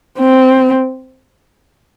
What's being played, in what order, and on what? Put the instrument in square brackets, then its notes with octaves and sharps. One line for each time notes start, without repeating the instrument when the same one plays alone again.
[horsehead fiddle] C4